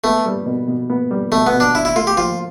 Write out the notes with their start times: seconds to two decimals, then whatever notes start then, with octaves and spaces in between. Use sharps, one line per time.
0.04 A3 B3
0.26 G3
0.46 B2
0.68 B2
0.90 B3
1.11 G3
1.32 B2 A3
1.47 B3
1.53 B2
1.60 D4
1.75 D4 E4
1.85 E4
1.96 A3 F4
2.07 G4
2.17 F3 F4